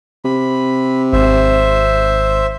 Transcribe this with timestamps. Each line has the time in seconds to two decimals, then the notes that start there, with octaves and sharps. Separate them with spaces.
0.25 C3 B5
1.13 G#1 C5 E5